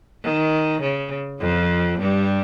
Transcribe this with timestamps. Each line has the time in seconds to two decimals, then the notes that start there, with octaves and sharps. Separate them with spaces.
0.23 D#3
0.81 C#3
1.40 F2 F3
1.99 G2 G3